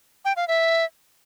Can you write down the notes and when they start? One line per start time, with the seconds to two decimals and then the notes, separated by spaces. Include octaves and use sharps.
0.25 G5
0.36 F5
0.48 E5